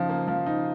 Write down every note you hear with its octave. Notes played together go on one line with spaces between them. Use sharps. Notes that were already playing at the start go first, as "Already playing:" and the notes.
Already playing: C#3 F3 D#4
A#3
F3
D#4